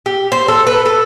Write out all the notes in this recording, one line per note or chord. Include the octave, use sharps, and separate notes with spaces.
G4
C5
A4
B4
A4